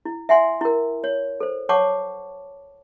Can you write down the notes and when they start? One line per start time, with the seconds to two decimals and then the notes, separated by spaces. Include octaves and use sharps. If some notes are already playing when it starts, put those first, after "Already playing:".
0.05 E4
0.29 E5 F#5 G#5 C6
0.61 E4 A#4
1.04 C#5
1.40 A4 C5
1.69 C#5 F#5 A5 C#6 D6